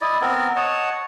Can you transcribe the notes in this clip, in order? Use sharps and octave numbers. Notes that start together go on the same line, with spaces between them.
E4 D5 D#5
B3 C4 A#4
C#5 D#5 F#5 A5